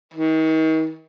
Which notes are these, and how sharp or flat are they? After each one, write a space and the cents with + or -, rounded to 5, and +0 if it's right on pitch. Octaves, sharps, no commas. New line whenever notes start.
D#3 +35